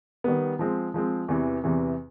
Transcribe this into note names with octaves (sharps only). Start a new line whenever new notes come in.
D#3 G3 B3
F3 G#3 C4
F3 G#3 C4
E2 C3 E3
E2 C3 E3